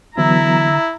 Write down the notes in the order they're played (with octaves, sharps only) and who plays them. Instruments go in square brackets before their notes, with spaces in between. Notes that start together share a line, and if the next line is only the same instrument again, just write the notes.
[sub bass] D3 [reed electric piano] E3 F#3 B3 [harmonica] E4 [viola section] E5 A#5